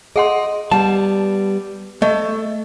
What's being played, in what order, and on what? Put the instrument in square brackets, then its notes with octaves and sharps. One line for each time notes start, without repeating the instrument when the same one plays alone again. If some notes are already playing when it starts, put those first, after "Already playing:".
[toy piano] G#4 F#5 C6 [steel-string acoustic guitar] D#5
[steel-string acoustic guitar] G3 B3 [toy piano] F#5 [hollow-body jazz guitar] A5
[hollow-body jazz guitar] A3 [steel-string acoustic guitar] A4 [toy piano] D#5